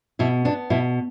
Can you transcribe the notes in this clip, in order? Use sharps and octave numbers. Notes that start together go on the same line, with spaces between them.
B2 E4
B3 D4
B2 E4